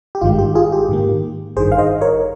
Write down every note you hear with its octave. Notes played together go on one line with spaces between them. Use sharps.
G4
G#1 G2 D#3 G#3 F4
G4
F4 G#4
G4
G#2 D#3 A#3
G#1 G2 D#3 G#4 C5
F5
C5 D#5
A#4 C#5